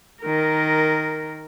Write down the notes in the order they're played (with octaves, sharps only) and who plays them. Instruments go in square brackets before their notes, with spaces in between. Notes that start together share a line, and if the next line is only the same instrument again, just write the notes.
[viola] D#3 A#4